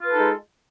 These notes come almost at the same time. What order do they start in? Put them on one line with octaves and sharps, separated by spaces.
F4 B4 A4 D#4 G#3